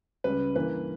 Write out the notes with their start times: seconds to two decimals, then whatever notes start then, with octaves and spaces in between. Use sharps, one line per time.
0.24 C#2 C#3 G3 B4
0.55 G2 E3 A#3 B4